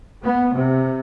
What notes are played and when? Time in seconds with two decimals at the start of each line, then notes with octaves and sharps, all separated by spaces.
0.22 B3
0.53 C3